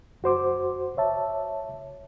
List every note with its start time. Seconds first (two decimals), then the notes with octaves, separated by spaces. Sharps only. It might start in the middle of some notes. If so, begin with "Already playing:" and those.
0.22 F#2 F#4 C5 D6
0.97 C#5 E5 A5